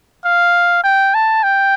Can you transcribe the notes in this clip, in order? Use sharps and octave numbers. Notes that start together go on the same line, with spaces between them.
F5
G5
A5
G5